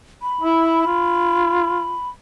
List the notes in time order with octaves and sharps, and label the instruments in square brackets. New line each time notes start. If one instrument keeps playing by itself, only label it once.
[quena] B5
[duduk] E4
F4